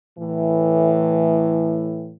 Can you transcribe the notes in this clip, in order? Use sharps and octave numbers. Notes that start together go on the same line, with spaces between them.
A2 E3